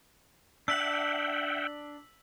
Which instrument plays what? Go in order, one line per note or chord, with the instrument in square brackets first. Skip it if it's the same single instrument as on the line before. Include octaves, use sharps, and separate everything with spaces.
[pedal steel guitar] D4 F#6 [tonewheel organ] E5 F#5 G5 [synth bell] E6 B6 F#7